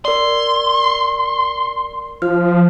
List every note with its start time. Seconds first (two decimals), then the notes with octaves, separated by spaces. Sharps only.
0.05 A#4 D5 C6
2.22 F3 F6